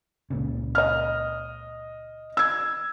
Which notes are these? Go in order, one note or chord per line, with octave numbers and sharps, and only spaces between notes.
C#2 A#2 C#3
D#5 F6
E6 G#6